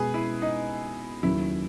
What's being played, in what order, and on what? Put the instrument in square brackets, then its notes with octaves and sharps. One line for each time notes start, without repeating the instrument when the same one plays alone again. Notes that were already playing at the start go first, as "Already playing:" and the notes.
Already playing: [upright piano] B2 G#3 C#4 F#4 [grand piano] G#4 B4
[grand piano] E4
D#4
[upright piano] D#2 C#3 F#3 [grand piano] E4